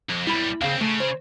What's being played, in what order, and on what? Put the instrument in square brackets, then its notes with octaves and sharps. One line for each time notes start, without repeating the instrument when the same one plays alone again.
[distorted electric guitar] F2
[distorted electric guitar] B1 G3 [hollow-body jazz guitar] E4 B5
[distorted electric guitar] D#2 C4 [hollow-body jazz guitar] C#3 F5
[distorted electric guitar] C#3 [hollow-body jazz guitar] A3
[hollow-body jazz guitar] C5